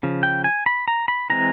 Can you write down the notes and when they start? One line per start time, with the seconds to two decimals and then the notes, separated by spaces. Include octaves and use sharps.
0.03 C#3 F3
0.23 G5
0.44 G#5
0.66 B5
0.88 A#5
1.08 B5
1.30 E3 G#3 C4 A#5